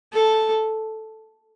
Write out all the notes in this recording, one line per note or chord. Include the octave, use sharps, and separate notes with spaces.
A4